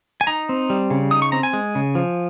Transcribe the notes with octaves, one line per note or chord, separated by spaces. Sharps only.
G#5
D#4 A#5
C4
G3
C#3
D#4 D#6
C#6
C4 A#5
G#5
G#3
C#3
F3